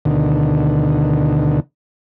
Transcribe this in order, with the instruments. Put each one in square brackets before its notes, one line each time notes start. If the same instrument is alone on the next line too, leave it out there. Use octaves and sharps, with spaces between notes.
[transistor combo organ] D2 B2 D3 D#3